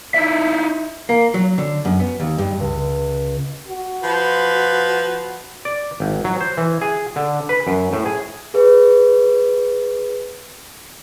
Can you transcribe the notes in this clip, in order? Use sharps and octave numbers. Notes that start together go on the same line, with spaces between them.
D#4 E4 E5
A#3
F#3
D3
F#2
B3
D#2
G2
C#2
F#4
F3 B4
D5
G#1
F#3
C5
E3
G#4
D3
B4
F#2
A2
G#4
G#4 B4 C#5